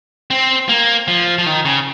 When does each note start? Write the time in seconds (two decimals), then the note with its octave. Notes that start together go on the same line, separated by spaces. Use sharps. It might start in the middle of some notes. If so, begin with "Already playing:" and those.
0.31 C4
0.69 A#3
1.08 F3
1.38 F3
1.46 D#3
1.65 C#3